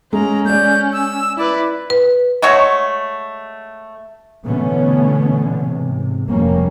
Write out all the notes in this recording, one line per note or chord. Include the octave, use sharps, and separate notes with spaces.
G#3 C#4 A#5
G#3 D5 G6
E6
E4 B4 D5
B4
G#3 A3 F#4 C#5
B2 D3 E3 A3 B3 C#4
G#2 C3
F1 B2 F3 G3 A#3 C#4